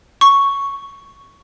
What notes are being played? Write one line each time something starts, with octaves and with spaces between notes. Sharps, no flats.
C#6